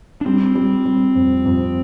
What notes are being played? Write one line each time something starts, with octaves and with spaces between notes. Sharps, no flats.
D4
G3 C4
G3
G3
F2
F2